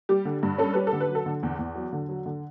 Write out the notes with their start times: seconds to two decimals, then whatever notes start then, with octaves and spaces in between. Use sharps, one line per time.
0.09 G3 G4
0.25 D3
0.43 G2
0.58 C#4 A4
0.73 G3 B4
0.87 A4
0.93 D3
1.00 B4
1.09 F#3
1.15 A4
1.26 D3
1.43 E2
1.59 E2
1.75 F#3
1.93 D3
2.09 F#3
2.26 D3